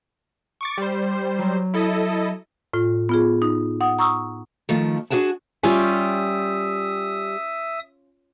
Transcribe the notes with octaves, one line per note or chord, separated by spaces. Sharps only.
C#6 D6 A6
G3 C5
F#3
E4 A4 D#5
A2 F4
B3 F4 G#4
D#4
F#5 D#6
A#5 C#6 D#6 E6
D#3 F3 A3
D4 F#4 G#4 F#5 A5
G3 C#4 F4 G4 E5 G#5 D#6